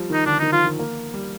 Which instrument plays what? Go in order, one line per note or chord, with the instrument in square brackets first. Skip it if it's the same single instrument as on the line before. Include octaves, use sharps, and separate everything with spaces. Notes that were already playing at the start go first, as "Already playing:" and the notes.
Already playing: [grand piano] F3 G3
[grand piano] D#3 [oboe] D#4
[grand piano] D3 [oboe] D4
[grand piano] D#3 [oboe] D#4
[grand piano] F3 [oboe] F4
[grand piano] D#3
A#3
G3